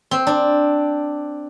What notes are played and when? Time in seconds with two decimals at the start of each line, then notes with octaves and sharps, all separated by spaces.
0.11 C4
0.27 D4